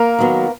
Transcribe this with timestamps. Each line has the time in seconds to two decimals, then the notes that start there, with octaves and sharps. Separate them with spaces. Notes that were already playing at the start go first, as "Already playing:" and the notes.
Already playing: A#3 A#4
0.19 D#3 F#3 B3